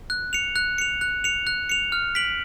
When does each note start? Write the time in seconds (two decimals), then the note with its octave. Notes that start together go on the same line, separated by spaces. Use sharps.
0.10 F#6
0.33 C#7 F7
0.56 F#6
0.78 C#7 F7
1.01 F#6
1.24 C#7 F7
1.47 F#6
1.69 C#7 F7
1.92 F6
2.15 B6 D7 F#7